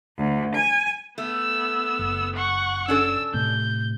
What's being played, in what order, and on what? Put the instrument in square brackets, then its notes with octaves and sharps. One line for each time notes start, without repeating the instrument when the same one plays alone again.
[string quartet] D2
G#5
[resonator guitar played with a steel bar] A3 [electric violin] B3 E6
[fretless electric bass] F#1
[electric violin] F#5 C#6
[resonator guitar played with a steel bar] C#4 D4 A4 [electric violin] E6
[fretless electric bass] A2 C3 [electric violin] G6